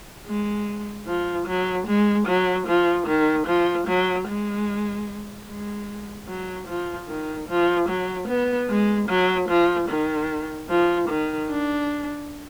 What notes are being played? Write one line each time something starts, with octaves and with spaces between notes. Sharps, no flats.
G#3
F3
F#3
G#3
F#3
F3
D#3
F3
F#3
G#3
G#3
F#3
F3
D#3
F3
F#3
B3
G#3
F#3
F3
D#3
F3
D#3
D4